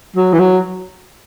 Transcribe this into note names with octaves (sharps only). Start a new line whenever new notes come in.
F#3
E3
F#3